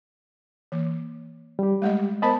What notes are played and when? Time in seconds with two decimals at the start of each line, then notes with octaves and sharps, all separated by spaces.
0.72 E3 A#3
1.59 G3 G4
1.82 G#3 A3 D#5
2.22 B3 A#4 C5 D#5 A5 B5